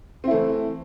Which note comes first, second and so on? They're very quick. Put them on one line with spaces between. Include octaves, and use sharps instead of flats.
C4 E4 A3 E3